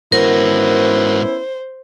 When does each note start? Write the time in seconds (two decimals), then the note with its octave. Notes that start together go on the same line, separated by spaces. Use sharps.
0.12 G#2 B3 C#4 E4 F#4 A#4 C5